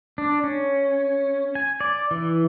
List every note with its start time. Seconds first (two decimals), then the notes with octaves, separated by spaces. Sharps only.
0.18 D4
0.44 C#4
1.55 G#5
1.81 D5
2.11 E3